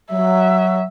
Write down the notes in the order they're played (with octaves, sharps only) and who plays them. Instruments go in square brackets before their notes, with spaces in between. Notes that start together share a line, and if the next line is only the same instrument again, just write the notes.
[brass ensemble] F#3 [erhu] E5